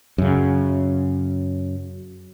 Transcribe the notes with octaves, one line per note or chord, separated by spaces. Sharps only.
F#2 C#3